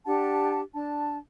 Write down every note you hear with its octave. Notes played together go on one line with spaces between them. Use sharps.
D4 G4 F#5 A5
D4 A5